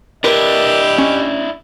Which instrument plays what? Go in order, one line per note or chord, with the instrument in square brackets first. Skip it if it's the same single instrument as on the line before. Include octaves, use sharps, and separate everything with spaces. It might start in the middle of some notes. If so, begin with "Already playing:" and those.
[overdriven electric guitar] D4 E4 [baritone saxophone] G4 [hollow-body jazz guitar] A#4 B4 [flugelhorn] D#5
[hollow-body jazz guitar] C#4